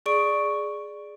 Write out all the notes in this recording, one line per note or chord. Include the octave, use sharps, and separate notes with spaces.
G#4 D5 C#6 D7